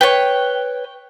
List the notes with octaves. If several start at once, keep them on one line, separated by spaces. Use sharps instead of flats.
B4 C#5 G5